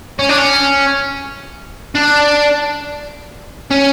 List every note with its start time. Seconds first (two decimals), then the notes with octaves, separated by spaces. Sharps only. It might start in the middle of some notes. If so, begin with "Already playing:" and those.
0.19 C#4
0.29 D4
0.38 C#4
1.95 D4
3.71 C#4